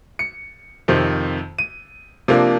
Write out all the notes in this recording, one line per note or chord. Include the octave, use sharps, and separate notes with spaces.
C#7
F2 C3 D#3
D#7
C3 F3 A#3 D4